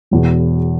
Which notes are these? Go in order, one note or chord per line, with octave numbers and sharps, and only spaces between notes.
E1 E2 B2